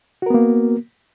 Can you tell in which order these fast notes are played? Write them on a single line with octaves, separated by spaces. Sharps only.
F#4 A#4 B3 A#3